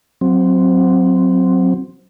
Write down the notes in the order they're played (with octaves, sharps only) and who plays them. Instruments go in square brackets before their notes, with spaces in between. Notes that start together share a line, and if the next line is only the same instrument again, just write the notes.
[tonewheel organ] F#3 C4